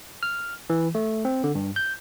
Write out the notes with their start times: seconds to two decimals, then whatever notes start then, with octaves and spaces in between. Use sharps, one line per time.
0.23 F6
0.70 E3
0.95 A3
1.25 C4
1.44 D3
1.55 G2
1.76 G6